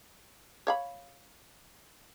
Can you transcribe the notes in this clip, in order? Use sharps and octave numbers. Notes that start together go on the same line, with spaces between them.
C#5 F5 B5